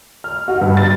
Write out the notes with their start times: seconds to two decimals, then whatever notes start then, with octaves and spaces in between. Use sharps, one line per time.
0.24 F6
0.48 F#4
0.61 G2
0.77 A6